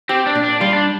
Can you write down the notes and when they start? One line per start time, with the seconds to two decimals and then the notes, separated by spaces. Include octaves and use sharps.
0.09 C4 G4
0.26 D4
0.35 A#2
0.44 D4
0.61 G3 F4
0.73 D4